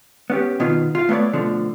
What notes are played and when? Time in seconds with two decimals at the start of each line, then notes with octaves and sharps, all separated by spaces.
0.30 B3 C#4 G4
0.60 B2 D#3 B3 F4
0.95 F4 F5
1.09 A3 B3 C#5 D5
1.33 B2 D3 F3 A3